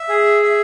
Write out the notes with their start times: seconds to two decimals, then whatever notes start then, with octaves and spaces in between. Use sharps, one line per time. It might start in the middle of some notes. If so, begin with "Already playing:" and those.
Already playing: E5
0.09 G#4
0.43 E5